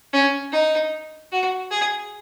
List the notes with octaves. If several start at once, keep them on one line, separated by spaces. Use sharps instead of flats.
C#4
D#4
F#4
G#4